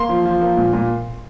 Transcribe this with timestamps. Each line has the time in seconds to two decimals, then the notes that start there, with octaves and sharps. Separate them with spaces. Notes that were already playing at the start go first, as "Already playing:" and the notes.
Already playing: A#3 C6
0.09 F3
0.26 F3
0.42 A#3
0.57 A#2
0.73 A#2